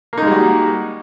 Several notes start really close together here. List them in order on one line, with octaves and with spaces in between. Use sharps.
A#3 D#4 G#3 G3 F#4